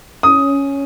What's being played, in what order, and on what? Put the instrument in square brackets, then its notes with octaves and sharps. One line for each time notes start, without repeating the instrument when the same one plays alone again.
[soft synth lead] C#4 [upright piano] D#6